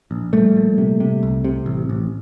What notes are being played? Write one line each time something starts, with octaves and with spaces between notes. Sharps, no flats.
A#1
A#1 G3 A3
A#2
C3
C3
C2
C3
A1
A1